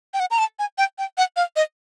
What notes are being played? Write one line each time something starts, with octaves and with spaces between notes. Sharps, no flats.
G5
F#5
A#5
A5
G#5
G5
G5
F#5
F5
D#5